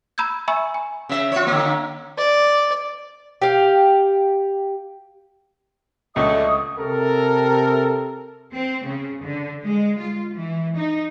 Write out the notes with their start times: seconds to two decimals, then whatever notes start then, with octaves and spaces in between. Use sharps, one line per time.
0.18 A#5 B5 E6 G6 G#6
0.48 E5 G#5 A#5 B5 C#6 E6
0.74 G#5
1.09 C#3 E5
1.32 F4 C#5
1.47 D3 A#3
2.18 D5
3.42 G4 F5
6.16 C#2 D3 A3 D#5 C#6 D#6
6.79 C3 A4 A#4
8.53 C4
8.85 C#3
9.23 D3
9.64 G#3
9.99 F4
10.34 E3
10.76 D#4